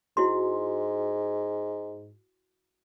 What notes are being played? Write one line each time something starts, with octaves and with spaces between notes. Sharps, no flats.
G#2 E4 F#4 C6